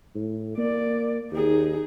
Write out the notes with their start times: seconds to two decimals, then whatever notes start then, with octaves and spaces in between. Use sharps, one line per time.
0.15 A2
0.58 A#3 D5
1.32 D#2 D#4 G#4